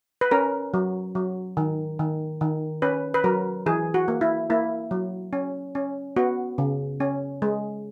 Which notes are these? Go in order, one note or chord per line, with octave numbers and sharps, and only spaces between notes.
B4
C#4 A#4
F#3
F#3
D#3
D#3
D#3
C#4 B4
B4
F#3 A#4
E3 G#4
F#4
A#3
E4
A#3 E4
F#3
C#4
C#4
B3 F#4
C#3
C#4
G#3